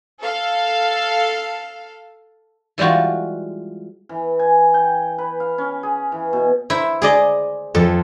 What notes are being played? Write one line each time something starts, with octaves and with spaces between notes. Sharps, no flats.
A4 F5
E3 G3 G#3 F4 F#4
E3
G#5
G5
B4
F5
C#4
G#4
E3
B2
E4 C5
G#4 D5 D#5
F2 A4